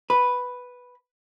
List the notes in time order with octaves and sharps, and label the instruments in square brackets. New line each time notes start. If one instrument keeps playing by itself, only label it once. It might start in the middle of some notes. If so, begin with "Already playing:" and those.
[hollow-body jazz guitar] B4